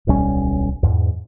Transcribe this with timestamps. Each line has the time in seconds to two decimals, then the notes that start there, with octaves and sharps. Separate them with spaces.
0.07 D1 B1 G3 C#4
0.83 E2 G#2